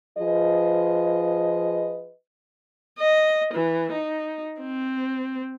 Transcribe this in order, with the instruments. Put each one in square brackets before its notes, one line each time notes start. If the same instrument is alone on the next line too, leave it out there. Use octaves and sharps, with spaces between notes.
[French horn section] F3 F4 G#4 B4 D#5
[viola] D#5
E3
D#4
C4